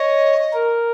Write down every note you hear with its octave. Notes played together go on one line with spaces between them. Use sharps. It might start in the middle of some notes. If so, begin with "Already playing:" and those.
Already playing: C#5 D#5
A#4